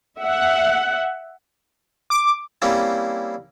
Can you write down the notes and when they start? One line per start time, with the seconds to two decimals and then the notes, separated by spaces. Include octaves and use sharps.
0.20 E5 F#5
2.10 D6
2.62 G3 A#3 C4 C#4 E4